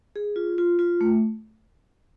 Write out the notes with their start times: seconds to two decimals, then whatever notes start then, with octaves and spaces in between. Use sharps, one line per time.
0.16 G#4
0.36 F4
0.58 F4
0.79 F4
1.01 A3